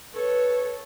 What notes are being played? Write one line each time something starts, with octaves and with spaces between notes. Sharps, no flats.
A4 B4 C#5